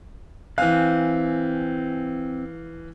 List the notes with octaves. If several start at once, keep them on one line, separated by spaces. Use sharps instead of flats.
E3 C4 F5 G#5 F#6